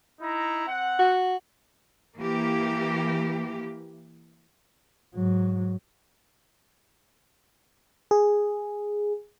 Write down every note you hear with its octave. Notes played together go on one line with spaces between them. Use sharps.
D#4 E4 A#5
C4 F#5
F#4
E3 A#3 G4
G#2 F#3
G#4